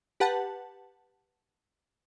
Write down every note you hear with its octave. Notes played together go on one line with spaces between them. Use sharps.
G4 B4 F#5 A5